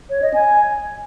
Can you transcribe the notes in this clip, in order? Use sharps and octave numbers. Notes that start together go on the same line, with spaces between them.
C#5
D#5
G#5